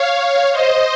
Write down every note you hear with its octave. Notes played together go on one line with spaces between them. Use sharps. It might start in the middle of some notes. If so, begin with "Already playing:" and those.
Already playing: C#5 F5
C5 D#5